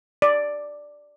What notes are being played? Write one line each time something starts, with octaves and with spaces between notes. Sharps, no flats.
D5